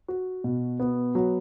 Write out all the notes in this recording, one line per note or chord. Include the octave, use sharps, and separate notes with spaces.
F#4
B2
B3
F#3